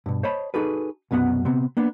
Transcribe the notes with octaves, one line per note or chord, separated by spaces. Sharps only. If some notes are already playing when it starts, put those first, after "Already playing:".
G2 B2
C5 C#5 D#5 A5 B5
D#4 F#4 G#4 A4 B4
C2 F#2 B2 B3 F#5
C3 B3 C4
A#3 B3 D4